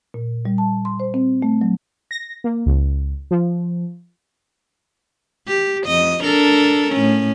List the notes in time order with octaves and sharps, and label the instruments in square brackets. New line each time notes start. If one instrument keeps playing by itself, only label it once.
[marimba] A#2
G3
A5
C6
C5
C4
A3
F#3
[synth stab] A#6
A#3
C#2
F3
[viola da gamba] G4
F2 D#5
D4 A4 A#4
A2 C#4